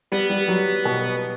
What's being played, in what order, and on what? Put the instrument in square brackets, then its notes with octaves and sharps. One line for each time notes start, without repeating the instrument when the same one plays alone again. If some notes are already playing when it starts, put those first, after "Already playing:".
[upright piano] G3 [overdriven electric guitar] B3
[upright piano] G3
F#3
B2